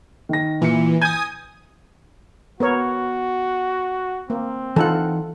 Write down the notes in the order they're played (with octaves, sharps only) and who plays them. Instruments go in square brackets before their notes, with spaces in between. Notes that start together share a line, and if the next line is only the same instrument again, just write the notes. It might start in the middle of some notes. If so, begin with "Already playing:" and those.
[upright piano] D#3 A#6
[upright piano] A#2 C#7 [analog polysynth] E3
[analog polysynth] G#5 D#6 [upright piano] G6 G#6 D#7
[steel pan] B3 A#4 C#5 [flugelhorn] F#4
[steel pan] A#3 [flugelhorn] C4
[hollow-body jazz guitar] E3 D#4 F#5 [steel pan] F4 A4